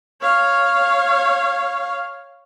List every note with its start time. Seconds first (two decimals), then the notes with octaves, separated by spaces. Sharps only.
0.21 C#5 F5